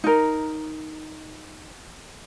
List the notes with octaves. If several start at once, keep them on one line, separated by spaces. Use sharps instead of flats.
D#4 A#4